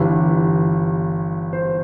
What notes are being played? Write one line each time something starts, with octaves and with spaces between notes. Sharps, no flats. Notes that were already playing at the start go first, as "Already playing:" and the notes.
Already playing: G1 G2 E3 B4
C5